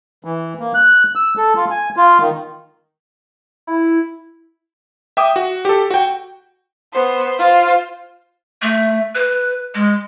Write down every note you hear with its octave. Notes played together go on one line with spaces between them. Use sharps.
E3
A#3
F#6
E6
A4
F4
G#5
F4
D#3
E4
E5 G5 D6 D#6
F#4
G4 A4
F#4 G5
B3 C5
F4 C5
A3
B4
G#3